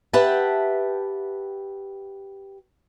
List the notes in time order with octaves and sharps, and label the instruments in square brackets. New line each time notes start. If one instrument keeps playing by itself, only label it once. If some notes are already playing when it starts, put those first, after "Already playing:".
[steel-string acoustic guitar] G4 B4 E5 F#5 G5 A5